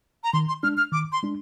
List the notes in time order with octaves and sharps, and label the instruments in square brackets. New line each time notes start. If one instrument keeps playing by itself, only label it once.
[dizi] A#5
[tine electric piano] D#3 [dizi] C6
[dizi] C6
[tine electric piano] G#3 D4 [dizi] F6
[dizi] F6
[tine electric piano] D#3 [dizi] D6
[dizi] C6
[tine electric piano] G#3 D4